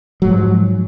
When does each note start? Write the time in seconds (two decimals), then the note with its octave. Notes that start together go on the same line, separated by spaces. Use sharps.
0.22 F#3
0.25 G#2
0.28 F3